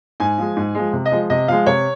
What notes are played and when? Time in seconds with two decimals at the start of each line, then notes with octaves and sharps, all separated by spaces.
0.20 G#2 G#5
0.38 F3 G#3
0.57 G#2
0.75 F3 G#3
0.93 C3
1.05 D#5
1.11 F3 G#3
1.30 C3 D#5
1.48 F3 G#3 F5
1.66 C3 C#5